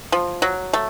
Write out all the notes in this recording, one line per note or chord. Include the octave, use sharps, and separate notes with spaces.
F3
F#3
A3